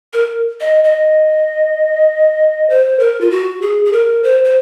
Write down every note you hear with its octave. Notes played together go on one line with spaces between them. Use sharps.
A#4
D#5
D#5
C5
A#4
F4
F#4
G#4
G#4
A#4
C5
C5